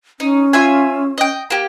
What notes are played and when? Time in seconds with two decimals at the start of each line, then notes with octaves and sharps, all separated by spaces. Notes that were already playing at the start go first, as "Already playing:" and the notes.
0.20 C#4 D#4
0.53 F4 E5 G#5
1.18 D#5 G5
1.50 A#3 G4